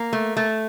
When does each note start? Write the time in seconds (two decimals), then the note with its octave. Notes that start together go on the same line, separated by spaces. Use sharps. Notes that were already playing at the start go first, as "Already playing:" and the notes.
Already playing: A#3
0.13 A3
0.37 A3